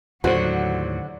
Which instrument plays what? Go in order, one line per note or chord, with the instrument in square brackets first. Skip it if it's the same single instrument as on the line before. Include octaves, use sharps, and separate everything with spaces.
[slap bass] D#2 A2 [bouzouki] D3 F#4 [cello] F#3 [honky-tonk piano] C5